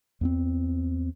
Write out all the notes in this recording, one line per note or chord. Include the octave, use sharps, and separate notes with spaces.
E2 B3 C4